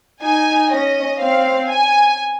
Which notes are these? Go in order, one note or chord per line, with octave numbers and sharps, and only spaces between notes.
D#4 G#5
C#4 D#5
C4 F5
G#5